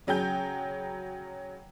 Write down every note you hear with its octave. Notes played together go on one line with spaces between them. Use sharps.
C#3 F#3 G#4 G5 G6